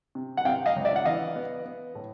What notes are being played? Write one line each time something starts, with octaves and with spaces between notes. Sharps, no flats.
C3
F#5
C3 F5 G5
D#5 F5
C#2
D5 E5
F#5
E3 D#5 F5
B3
B3
A2